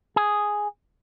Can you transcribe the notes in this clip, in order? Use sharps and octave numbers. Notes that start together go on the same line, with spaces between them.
G#4